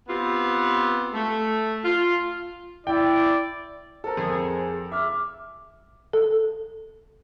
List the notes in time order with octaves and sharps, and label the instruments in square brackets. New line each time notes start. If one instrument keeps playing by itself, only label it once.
[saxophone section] B3 C4 F4 G4
A3
F4
[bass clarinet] E4 [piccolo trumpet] D5 [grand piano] G5
[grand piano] A4 A#4 [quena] C5
[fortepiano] F2 [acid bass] G#4
[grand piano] E5 F6 [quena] D6
[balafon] A4